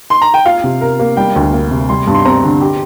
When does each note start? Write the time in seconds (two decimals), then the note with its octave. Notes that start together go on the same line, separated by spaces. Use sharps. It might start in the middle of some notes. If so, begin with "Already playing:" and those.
0.10 C6
0.22 A#5
0.34 G5
0.45 F4 F5
0.64 C3
0.81 A#4
1.00 A#3
1.17 G3 G5
1.36 D2
1.53 A#3
1.71 C3
1.89 G3 C6
2.07 G2
2.14 C6
2.25 C4 A#5
2.44 D3
2.61 G4